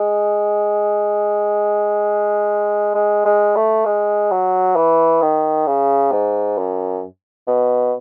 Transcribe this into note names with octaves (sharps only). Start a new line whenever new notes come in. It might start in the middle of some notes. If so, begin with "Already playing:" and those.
Already playing: G#3
G#3
G#3
A3
G#3
F#3
E3
D#3
C#3
G#2
F#2
B2